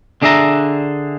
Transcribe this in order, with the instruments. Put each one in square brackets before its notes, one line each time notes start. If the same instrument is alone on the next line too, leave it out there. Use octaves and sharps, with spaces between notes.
[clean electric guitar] D3 D4 G#4 D#5 E5 A#5